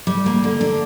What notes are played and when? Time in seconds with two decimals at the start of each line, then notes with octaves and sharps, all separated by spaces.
0.07 G3
0.26 A#3
0.44 D3
0.61 D4